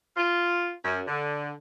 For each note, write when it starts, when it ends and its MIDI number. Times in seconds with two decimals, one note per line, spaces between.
0.16 0.70 65
0.84 1.02 42
1.08 1.53 50